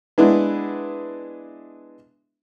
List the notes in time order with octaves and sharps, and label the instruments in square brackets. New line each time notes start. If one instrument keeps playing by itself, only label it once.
[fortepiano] G#3 B3 D4 E4